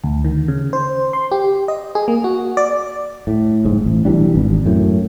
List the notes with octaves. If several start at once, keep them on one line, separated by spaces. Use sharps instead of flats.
D2
D#3
C#3
C5
C6
G4
D#5
G#4
A#3
F#4
D5
A2
F#1 G#2
A1
B1 E3 G3 D4
G#1
F#2 A2